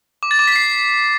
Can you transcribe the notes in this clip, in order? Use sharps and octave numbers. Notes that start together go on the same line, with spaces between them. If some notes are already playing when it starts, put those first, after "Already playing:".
D6
A6
D6
B6
C7